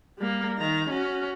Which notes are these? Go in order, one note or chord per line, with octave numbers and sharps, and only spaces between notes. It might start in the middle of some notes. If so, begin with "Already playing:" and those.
G3 A#3
D#3 A#5
C#4 F#4